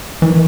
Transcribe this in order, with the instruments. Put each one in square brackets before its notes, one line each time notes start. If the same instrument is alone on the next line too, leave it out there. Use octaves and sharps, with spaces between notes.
[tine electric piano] D#3 [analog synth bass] E3